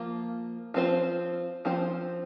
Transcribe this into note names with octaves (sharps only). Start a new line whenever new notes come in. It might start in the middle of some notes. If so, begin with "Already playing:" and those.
Already playing: F3 A#3 F4
F3 C4 F4 C5
F3 C4 F4 C5